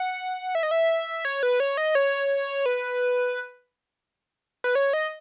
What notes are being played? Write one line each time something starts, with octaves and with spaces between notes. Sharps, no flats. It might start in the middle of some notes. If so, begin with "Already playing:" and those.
Already playing: F#5
E5
D#5
E5
C#5
B4
C#5
D#5
C#5
B4
B4
C#5
D#5